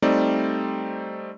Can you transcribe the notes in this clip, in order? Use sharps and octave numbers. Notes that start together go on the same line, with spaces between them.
G3 A3 C4 D#4 D5